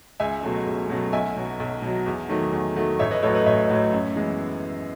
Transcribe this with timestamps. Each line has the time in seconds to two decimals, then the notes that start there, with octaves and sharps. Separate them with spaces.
0.20 C#2 E5 G#5
0.43 B2 F#3 A3
0.66 C#2
0.89 B2 F#3 A3
1.13 B1 E5 G#5
1.36 B2 F#3
1.60 B1
1.82 B2 F#3
2.06 E2
2.29 D#3 F#3 A3
2.53 E2
2.76 D#3 F#3 A3
2.99 A1 C#5 E5
3.11 B4 D#5
3.23 A2 F#3 A4 C#5
3.35 B4 D#5
3.46 A1 C#5 E5
3.70 A2 F#3
3.93 F#2
4.16 E3 G#3 B3